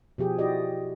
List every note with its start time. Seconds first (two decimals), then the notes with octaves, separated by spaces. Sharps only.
0.18 B2 F3 G4 G#4
0.38 E4 F#4 G4 D5 D#5